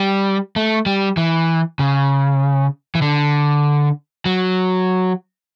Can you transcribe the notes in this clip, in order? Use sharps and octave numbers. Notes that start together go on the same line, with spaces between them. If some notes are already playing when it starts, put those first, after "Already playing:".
Already playing: G3
A3
G3
E3
C#3
E3
D3
F#3